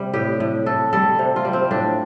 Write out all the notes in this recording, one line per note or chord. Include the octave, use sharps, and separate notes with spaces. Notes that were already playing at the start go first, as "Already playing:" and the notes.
Already playing: C3 G3
A2 G4
A2
A2 A4
G3 A4
C3
F4
G3
C4
A2 D4